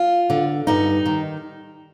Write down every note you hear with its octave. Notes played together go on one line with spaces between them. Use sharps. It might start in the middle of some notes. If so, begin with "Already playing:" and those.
Already playing: F4
D3
G2 D#4
D#3